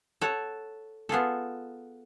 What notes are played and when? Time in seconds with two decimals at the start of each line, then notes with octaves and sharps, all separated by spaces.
0.21 A4 C#5 F#5
1.09 B3 F4 G#4 A4